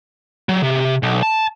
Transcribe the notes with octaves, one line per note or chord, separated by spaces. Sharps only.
F#3
C3
B1
A5